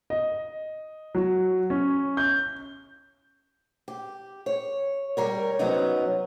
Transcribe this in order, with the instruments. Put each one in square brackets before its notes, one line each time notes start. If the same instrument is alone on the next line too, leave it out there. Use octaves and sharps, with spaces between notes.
[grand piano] D#5
F#3
C#4
G6
[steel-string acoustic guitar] G4
C#5
G3 A#4 C#5
C3 F#3 B3 C#4 D#4